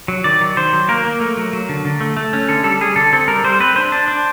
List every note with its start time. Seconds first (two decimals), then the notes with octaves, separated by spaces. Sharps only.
0.08 F#3
0.24 D#3 D5
0.41 F#3
0.57 D#3 C5
0.73 F#3
0.88 A#3 A#4
1.04 A#3
1.20 A3
1.37 F#3
1.53 F#3
1.69 D3
1.85 D3
2.01 A3
2.17 A3
2.33 C#4
2.49 D3 A4
2.64 G3 A4
2.81 G3 G#4
2.96 D3 A4
3.13 C4 A4
3.28 G3 A#4
3.44 G3 C5
3.60 C4 B4
3.76 D4 C5
3.92 D4
4.08 D4